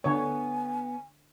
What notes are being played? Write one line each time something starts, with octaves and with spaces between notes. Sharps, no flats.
D3 B3 C#5 G#5